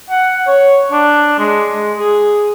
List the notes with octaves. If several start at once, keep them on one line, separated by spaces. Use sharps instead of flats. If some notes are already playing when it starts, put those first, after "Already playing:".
F#5
C#5
D4
G#3
G#3
G#4